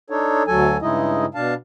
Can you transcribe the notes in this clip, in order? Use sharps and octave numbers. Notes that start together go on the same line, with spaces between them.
D4 D#4 A4 C#5
D2 F#3 A4 G#5
G2 C#3 G#3 D#4 E4 D#5
B2 D4 F5 A5